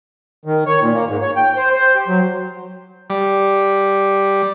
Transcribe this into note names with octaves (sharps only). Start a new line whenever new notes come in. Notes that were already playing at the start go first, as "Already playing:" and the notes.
D#3
C#5
A#2
A#3
G#2
C#5
G5
C5
C5
G4
F#3
G3